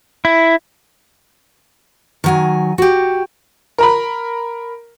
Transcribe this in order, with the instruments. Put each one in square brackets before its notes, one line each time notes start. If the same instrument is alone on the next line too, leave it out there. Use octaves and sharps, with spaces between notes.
[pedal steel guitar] E4
[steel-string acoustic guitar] D#3 F#3 G#5
F#4 G4
[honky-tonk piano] A#4 A#5 B5